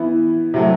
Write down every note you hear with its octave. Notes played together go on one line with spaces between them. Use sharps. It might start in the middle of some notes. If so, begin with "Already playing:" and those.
Already playing: E3 B3 E4
C3 F#3 A3